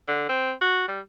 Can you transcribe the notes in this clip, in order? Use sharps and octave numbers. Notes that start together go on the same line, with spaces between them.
D3
C4
F#4
G3